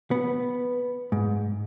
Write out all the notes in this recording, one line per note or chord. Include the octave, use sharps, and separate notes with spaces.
B3
G#2